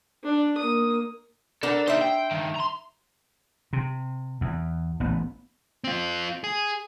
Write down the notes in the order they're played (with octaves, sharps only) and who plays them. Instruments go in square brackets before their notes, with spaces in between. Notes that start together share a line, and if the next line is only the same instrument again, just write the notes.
[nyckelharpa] D4
A#3 D#6
[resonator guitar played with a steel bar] B3 D4 A#4 [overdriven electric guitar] A4
[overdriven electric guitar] A#3 D#4 [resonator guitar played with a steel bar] C5 E5
[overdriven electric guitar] G5
G2 D#3
A#5 C6
[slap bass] C3
E2
A1 B3
[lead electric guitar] C4 F4
G#4